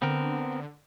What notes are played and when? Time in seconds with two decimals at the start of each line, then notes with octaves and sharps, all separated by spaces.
0.02 D3 B3 C4 A#4